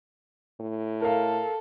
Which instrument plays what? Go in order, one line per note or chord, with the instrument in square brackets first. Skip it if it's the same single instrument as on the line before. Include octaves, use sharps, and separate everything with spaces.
[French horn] A2
[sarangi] A4 [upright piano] A#4 F5